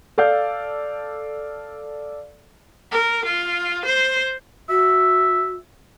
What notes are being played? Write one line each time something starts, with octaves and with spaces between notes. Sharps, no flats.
A4 D5 F5 G6
A#4
F4
C5
F#4 E5